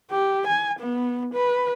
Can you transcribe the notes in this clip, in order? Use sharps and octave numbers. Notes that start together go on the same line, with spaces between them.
G4
G#5
B3
B4